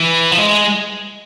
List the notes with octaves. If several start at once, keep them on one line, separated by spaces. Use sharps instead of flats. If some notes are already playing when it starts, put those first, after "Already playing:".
Already playing: E3
F3
G#3